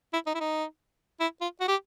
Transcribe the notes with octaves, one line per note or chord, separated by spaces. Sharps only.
E4
D#4
E4
D#4
E4
F4
F#4
G4